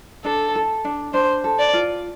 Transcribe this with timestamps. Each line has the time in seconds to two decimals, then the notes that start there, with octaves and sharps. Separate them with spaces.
0.24 D4 A4
0.55 A4
0.85 D4
1.14 D4 C5
1.44 A4
1.59 D5
1.73 F4